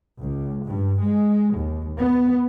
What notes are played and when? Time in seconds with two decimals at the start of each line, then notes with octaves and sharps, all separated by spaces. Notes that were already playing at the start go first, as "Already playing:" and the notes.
0.21 C#2
0.66 G2
1.02 G#3
1.56 D#2
1.98 B3